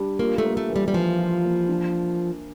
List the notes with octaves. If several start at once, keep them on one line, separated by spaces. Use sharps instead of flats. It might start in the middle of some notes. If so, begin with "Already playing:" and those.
Already playing: G3 D4
A#3 F4
A3
A#3
A3
E3
G3
G3
E3 F3
F4
A#3
D4